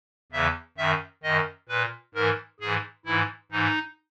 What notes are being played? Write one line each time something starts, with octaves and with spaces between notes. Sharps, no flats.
E2 C#3 E3 E5
F#2 D#3 E5
F#2 D#3 D#5
A#2 B4
G#2 E3 A#4
G#2 E3 G#4
G#2 E3 E4
G#2 E3 D#4